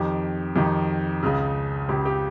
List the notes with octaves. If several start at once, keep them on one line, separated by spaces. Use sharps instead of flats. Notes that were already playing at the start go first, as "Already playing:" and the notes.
Already playing: F2 D#3 G4
F2 D#3 G4
C#2 C#3
C#2 C#3 G4
G4